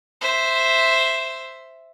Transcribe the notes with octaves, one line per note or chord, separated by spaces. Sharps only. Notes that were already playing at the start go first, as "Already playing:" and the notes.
C5 E5